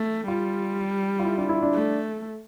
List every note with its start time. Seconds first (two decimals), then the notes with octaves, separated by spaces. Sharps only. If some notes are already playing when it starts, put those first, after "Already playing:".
Already playing: A3
0.27 G3 F4
1.19 F4
1.25 E4
1.38 D4
1.49 E4
1.62 D4
1.74 A3